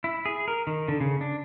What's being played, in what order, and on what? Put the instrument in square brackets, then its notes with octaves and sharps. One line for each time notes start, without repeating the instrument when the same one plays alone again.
[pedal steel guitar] E4
G#4
A#4
D#3
D3
C#3
D4